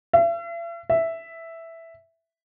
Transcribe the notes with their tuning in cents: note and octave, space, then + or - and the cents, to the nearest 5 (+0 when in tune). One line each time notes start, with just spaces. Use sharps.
E5 +45
E5 +0